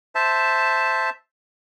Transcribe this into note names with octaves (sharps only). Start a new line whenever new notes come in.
C5 E5 A5